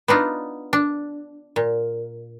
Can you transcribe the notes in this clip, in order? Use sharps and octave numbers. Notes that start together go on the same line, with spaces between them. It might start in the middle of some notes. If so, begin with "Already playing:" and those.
B3 D4 D#4 F4
D4
A#2